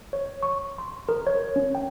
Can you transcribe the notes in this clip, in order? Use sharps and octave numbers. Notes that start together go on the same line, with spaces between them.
C#5
C#6
C6
A#4
C#5
C#4
G5